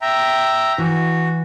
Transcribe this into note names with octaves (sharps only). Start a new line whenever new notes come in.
E5 G5 A#5
E3 F#4